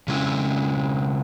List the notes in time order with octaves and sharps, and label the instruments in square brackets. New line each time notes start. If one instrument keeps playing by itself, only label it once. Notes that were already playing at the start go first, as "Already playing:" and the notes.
[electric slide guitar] C#3 G#3 C#4 E4